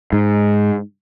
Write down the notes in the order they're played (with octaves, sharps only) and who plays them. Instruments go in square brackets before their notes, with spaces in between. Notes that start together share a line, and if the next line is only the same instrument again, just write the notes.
[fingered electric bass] G#2